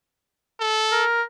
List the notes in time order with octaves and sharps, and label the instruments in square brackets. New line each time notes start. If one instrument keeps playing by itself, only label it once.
[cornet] A4
[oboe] A#4